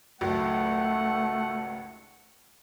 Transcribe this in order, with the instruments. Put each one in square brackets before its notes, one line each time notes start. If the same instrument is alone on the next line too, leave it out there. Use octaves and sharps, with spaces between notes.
[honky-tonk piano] G#1 C#2 F#3 [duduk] A3 [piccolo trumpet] F#5